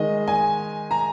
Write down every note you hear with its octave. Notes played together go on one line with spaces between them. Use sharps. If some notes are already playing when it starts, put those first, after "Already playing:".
Already playing: D#3 G#3 D#5
G#5
A#5